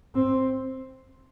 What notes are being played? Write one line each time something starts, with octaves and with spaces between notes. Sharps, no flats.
C4